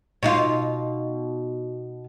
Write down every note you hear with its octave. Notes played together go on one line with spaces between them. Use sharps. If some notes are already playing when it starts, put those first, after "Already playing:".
B2 D#4 F4